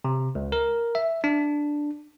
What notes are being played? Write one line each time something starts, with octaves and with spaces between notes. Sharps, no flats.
C3
C#2
A#4
E5
D4